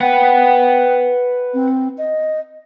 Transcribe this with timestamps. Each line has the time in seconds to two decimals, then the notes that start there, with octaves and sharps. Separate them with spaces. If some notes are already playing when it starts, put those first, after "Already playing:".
0.01 B4 F#5 G5
1.54 C4
1.98 D#5